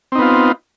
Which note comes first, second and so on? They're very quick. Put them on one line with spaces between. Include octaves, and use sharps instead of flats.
C4 D#4 B3 F4